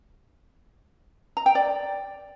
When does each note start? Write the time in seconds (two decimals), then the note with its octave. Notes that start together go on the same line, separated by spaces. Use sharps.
1.37 A#5
1.46 G5
1.55 D5